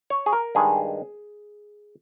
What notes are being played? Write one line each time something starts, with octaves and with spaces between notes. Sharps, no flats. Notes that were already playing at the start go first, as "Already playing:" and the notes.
C#5
G#4
A#4
G2 D#3 G#3 G#4